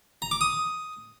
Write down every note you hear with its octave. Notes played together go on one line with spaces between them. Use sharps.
A#5
D6
D#6